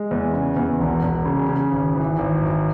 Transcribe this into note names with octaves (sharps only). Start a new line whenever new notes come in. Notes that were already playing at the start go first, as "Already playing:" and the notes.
Already playing: G#3
E2
C#3
E2
E1
E1
C#3
C#3
G#1
E3
G#1
F#2